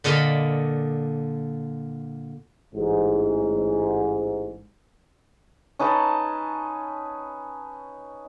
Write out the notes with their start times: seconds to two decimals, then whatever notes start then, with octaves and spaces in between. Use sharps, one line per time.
0.04 A#2 D3 D#5 F5 B5
2.73 A1 G#2
5.79 C#4 D#4 B4 A5